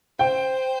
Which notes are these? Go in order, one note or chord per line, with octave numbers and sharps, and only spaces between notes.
C5 G5